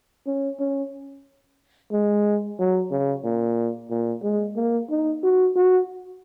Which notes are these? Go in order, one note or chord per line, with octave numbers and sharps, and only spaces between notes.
C#4
C#4
G#3
F#3
C#3
A#2
A#2
G#3
A#3
D#4
F#4
F#4